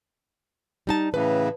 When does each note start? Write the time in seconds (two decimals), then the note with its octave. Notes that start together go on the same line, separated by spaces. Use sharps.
0.87 G3 D#4 A5
1.14 A2 C#3 E3 B4